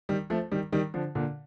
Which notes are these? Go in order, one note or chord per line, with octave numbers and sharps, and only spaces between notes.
D#3 G3
F3 A3
D#3 G3
D#3 G3
D3 F3
A#2 D3